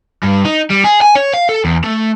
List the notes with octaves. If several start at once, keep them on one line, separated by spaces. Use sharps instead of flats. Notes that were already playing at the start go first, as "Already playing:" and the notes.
G2
D#4
G3
G#4
G#5
C#5
F5
A4
E2
A3